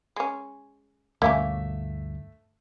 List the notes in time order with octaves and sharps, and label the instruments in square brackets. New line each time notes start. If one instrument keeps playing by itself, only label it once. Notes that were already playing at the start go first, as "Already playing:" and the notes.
[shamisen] G#3 C#4
[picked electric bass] D2 G2 [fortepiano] A3 E5 [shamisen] A#3 C#4 G4